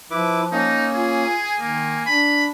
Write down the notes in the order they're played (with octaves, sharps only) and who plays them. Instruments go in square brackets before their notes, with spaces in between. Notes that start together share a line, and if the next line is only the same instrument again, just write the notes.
[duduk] F3 [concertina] E4 B4 D6
[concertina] A#3 C#4 [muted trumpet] D#4
[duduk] F4 [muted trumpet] G#4
[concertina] G#5
[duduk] D#3 [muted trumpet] A#3
[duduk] D4 [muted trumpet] B5